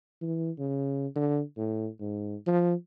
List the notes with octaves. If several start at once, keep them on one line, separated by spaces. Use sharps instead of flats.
E3
C#3
D3
A2
G#2
F3